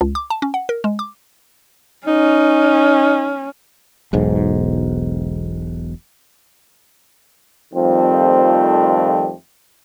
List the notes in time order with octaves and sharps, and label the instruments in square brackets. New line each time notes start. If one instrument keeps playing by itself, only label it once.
[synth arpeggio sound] C#2
D6
A5
C#4
F#5
A#4
G#3
D6
[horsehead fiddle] C#4 [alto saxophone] D#4
[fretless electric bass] E1 B1 G#2
[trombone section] F2 D#3 F3 G3 A3 C4